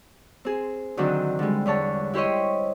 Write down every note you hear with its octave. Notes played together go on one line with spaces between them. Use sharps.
C4 G#4
D3 D#3 F#3 C4 D4 D#4
D3 G3 G#3
E2 D3 C#5 A5
E4 G4 C5 C#5 D#5